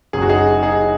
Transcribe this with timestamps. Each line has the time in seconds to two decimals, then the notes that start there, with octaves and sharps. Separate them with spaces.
0.13 F#1 F#2 F#3 G#4
0.22 F#4
0.29 D#4 G#4
0.63 D#4 G#4